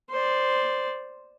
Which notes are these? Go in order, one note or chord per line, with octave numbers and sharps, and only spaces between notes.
C5 D5